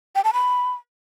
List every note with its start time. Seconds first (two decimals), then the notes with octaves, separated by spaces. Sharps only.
0.15 G5
0.24 A5
0.33 B5